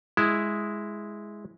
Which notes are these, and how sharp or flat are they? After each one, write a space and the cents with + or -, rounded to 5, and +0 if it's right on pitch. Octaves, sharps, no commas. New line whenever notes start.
G#3 +0 E4 +0